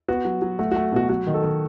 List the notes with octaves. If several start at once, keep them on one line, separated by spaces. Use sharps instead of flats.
B3 F#4
F#3
F#3
A3 F#4
A3 F#4
B2 F#4
F#3 F#4
D#3
A4
D#3